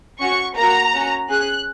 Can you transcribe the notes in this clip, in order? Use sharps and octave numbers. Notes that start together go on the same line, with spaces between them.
C#4 F#4 C#6
A#3 A#5
F#4
C#4 F#4
C#4 G#4 F#6